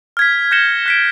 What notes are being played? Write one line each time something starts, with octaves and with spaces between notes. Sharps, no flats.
F6 G#6 B6
G6 A#6 C#7 E7 G7
F#6 B6 D7